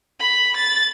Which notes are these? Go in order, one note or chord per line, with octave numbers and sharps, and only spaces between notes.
B5
A6